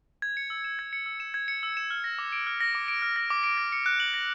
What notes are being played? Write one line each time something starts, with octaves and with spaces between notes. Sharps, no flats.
G#6
C#7
E6
E7
G#6
C#7
E6
E7
G#6
C#7
E6
E7
F6
A#6
D6
D7
F6
A#6
D6
D7
F6
A#6
D6
D7
A#6
C#7
F#6
F#7
A#6